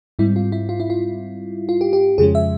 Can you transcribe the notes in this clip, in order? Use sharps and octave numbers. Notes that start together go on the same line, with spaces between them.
G#2 G3 C4 E4
F4
E4
F4
E4
F4
F4
G4
G4
F2 C#3 F3 G#3 C#4 G#4
E5